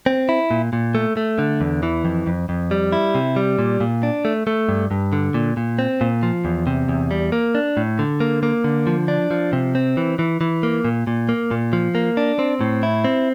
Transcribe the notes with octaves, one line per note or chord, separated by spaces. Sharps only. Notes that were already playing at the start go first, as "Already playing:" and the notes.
C4
E4
A#2
A#2
A3
A3
D3
E2
E3
F2
F2
F2
G3
E4
C3
G3
A#2
A#2
D4
A3
A3
G2
G2
D3
A#2
A#2
C4
A#2
F3
E2
C3
E2
G3
A#3
D4
A2
D3
A#3
A#3
D3
F3
D4
F3
C3
C4
E3
E3
E3
A#3
A#2
A#2
A#3
A#2
F3
A#3
D4
C4
A2
E4
C4